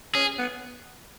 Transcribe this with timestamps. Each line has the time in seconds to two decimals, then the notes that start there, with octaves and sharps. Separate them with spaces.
0.15 C#4 G#4
0.39 B3